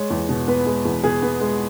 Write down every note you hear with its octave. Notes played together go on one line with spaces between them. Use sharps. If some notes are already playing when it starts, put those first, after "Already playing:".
Already playing: G#3 C#5
E2
B2
B3 B4
G#3
E2
B2 G#4
B3
G#3